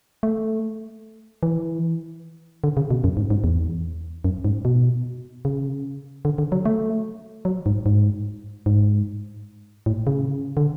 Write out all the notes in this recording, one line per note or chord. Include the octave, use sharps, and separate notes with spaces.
A3
E3
D3
C#3
B2
F#2
G#2
G#2
E2
F#2
G#2
B2
C#3
D3
D3
F#3
A3
F#3
G#2
G#2
G#2
A2
C#3
D3